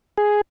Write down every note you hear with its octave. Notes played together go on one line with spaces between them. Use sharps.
G#4